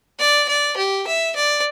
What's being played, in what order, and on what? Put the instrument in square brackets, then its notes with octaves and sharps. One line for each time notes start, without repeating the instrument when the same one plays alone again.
[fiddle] D5
D5
G4
E5
D5